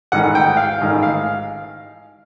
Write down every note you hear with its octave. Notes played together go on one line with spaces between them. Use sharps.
A1 G#2 D#3 F#5
G5
F5
A1 G#2 D#3
F5